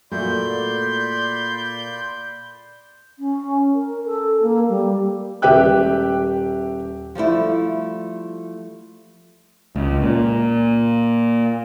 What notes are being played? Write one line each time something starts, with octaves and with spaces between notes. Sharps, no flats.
A#2 A3 F#4 D5 B5 C6 G6
C#4
A#4
A4
A#3
G3
D#1 G4 B4 E5 G5 F#6
F3 G3 A3 E4
C#2
A#2